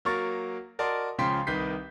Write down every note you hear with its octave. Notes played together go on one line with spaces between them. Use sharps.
F#3 A#3 A#4 C#6 A6
F#4 A#4 D5 D#5 A5 C6
C#2 C#3 F3 G5 C6 B6
C2 D#3 B4 G6 B6 C7